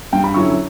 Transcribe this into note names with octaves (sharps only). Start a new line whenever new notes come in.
G2 G5
B5
D3 F#3 C#4 E4 C#6